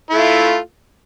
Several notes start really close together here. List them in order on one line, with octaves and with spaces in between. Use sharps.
E4 A3 F4